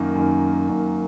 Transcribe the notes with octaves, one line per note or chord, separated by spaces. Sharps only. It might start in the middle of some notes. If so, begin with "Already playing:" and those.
Already playing: F#2 D#3 A#3
F#2 D#3 A#3
F#2 D#3 A#3